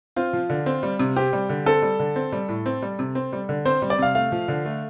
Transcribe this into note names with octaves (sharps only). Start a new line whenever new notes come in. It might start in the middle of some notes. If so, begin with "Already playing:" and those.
C4 F4
F3
D3
C4
G3
C3
C4 G4
G3
D3
C4 A4
G3
D3
C4
G3
A2
C4
G3
C3
C4
G3
D3
C4 C5
G3
D5
C3 F5
A3 F5
F3
D3
A3